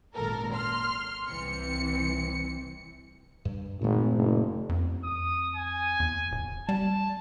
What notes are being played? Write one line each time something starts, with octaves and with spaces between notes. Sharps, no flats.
G#1 F#2 A#2 A4 A#4
C6 F6
C2 E3 C4 C#7
G2
G#1 A#2 A3
F#1
F2
D#6
G#5
E2
D1
G3 A5